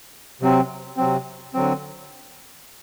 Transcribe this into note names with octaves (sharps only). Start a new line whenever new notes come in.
C3 F#3 C4
C3 F#3 C4
D3 F#3 C4